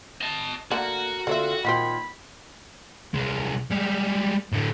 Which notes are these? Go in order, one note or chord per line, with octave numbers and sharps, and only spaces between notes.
D#5 A5
D3 A3 A#3 F#4 A#4 F#5
D3 A#3 C4 F4 C#5 E5
A#2 D#3 C4 F4 F#4 B5
C2 G#3
G3 G#3
A2 D3